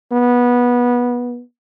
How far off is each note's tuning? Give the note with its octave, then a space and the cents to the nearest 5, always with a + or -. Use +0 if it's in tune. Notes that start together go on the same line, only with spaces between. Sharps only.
B3 -20